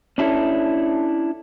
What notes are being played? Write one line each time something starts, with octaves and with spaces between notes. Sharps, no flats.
C#4 D4 E4 F#4 A4